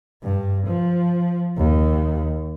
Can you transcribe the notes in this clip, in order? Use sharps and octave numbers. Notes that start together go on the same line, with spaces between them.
G2
F3
D#2